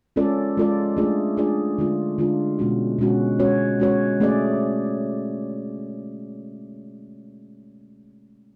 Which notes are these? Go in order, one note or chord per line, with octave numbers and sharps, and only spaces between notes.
G#3 C#4 F4 A4 D5
G#3 C#4 F4 A4 D5
A3 D4 F4 G#4 D5
A3 D4 F4 G#4 D5
D3 G#3 D4 F4
D3 G#3 D4 F4
B2 G#3 C#4 F#4
B2 G#3 C#4 F#4
G#3 C#4 F#4 C#5
G#3 C#4 F#4 C#5
A3 C#4 G#4 D5